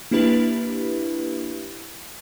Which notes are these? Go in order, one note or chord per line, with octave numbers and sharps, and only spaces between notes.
A#3 D4 E4 G4 B4